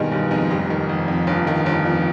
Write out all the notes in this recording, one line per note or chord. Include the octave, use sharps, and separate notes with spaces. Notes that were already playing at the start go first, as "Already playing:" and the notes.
Already playing: G1 G#2 B2 D#3 G3 G#3
G1 G3
F2 G#2 G#3
F1 G3
D#3
F1
F2
G1
D#3
G1
F2